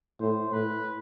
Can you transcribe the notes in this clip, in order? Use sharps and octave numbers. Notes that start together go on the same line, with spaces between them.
A2 C5
A2 B4